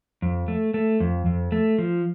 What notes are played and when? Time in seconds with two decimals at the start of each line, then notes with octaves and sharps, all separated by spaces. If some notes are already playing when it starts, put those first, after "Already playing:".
0.22 F2
0.48 A3
0.74 A3
1.00 F2
1.26 F2
1.52 A3
1.78 F3